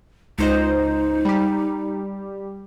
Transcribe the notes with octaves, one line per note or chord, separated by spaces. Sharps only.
C#2 D#4 C5 D#5
G3 G4